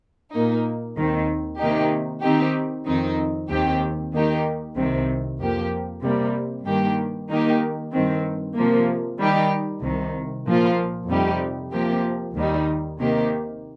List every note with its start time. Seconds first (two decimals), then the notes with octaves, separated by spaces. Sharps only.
0.32 A#2 A#3 D#4
0.96 D#2 D#3 C4
1.59 C3 D#3 A#3 D#4 G4
2.22 D#3 C4 D#4 G4
2.86 F2 D#3 C4 D#4
3.49 D#2 D#3 C4 G4
4.13 D#3 A#3 D#4 G4
4.76 C2 C3 D#3 C4
5.39 F2 F3 A#3 G4
6.02 C3 G3 A#3
6.65 G2 D#3 A#3 G4
7.29 D#3 A#3 D#4 G4
7.92 G2 D#3 C4
8.55 C3 F3 A#3
9.18 D#3 G3 D#4 G4
9.82 C2 C3 D#3
10.46 A#2 F3 A#3 F4
11.08 F2 C3 G3 D#4 G4
11.72 C3 F3 A#3 G4
12.36 D#2 D#3 G3 D#4
12.98 C3 D#3 A#3 D#4 G4